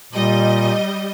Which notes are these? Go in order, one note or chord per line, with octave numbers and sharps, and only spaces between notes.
A#2 G3 D#5